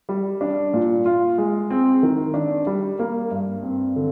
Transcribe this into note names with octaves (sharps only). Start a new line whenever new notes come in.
G3
D4
A#2
F4
G#3
C4
D#3
D4
G3
A#3
G2
C4
D3